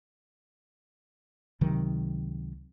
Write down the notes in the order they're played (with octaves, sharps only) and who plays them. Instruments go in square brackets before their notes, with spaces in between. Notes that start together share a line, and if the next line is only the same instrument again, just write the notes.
[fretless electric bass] C#2 C3 D#3 F#3